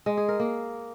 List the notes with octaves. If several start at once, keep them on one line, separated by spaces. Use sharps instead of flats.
G#3
G#4
A#4
A#3